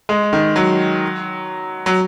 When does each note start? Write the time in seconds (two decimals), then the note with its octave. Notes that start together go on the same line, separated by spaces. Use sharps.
0.09 G#3
0.33 D#3
0.56 F#3
1.86 F#3